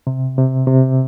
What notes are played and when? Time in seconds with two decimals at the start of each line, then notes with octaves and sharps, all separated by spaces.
0.07 C3
0.38 C3
0.67 C3